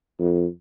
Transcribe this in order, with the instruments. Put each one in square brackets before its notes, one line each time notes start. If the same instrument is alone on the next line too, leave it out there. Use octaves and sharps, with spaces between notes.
[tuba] F2